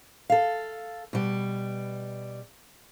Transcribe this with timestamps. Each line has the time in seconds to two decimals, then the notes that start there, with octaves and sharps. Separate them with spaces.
0.30 A4 F5
1.13 B2 G3